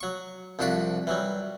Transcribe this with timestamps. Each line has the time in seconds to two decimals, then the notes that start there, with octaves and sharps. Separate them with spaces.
0.01 F#3 C#6
0.59 C2 F2 D4 F#4 A5 B5
1.07 E3 F#3 G3